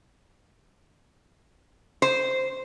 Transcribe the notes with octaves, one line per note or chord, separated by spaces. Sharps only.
C5